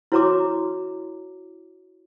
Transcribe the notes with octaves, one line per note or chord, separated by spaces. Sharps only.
E4 F#4 C#5 A#5 C6 D6